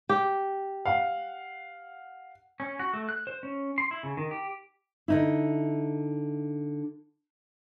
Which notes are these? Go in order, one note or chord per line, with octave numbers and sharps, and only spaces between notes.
G4
F5 F#5
C#4
F#4
A3
F#6
C5
C#4
C6
E4
C#3
D#3
G4
D3 D#4 E4